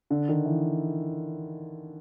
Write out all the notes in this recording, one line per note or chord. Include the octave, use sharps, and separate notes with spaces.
D3
D#3
E3